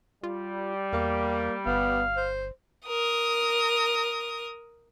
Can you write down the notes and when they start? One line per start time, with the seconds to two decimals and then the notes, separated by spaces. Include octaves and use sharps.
0.23 G3 F4
0.93 E2 A#3
1.66 G1 B3 F5
2.17 C5
2.87 A#4 D#6